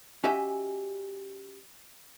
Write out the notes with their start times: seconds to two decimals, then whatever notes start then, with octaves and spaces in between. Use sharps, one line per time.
0.24 C#4 F#4 G4 D#5 E5 G#5